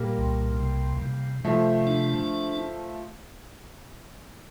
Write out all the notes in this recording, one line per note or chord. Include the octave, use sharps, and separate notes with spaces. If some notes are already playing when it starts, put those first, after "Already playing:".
Already playing: A#2 G3 A#3
C2
C3
C3
C3 F3 A3
D4